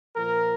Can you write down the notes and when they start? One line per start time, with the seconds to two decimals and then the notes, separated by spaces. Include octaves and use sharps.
0.15 A#2 F3 A#4